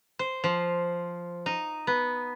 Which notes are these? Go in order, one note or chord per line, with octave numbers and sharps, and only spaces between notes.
C5
F3
D#4
B3